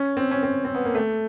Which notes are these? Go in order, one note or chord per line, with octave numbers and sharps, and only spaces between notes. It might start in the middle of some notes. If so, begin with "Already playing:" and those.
Already playing: C#4
C4
C#4
C4
C4
B3
A#3
A3